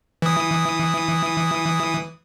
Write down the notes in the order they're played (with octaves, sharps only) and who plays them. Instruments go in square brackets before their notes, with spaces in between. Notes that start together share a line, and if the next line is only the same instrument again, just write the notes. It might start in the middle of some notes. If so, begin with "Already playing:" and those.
[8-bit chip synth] E3 D#6